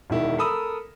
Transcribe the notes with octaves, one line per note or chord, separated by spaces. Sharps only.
E1 D#3 E4
A4 A#4 B5 D#6 E6